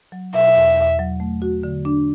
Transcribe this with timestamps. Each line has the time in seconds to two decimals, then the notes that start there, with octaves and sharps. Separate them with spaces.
0.12 F#3
0.34 B2 E5
0.56 E2
0.77 E2
0.99 F#3
1.20 A3
1.42 F#4
1.63 D3
1.85 D4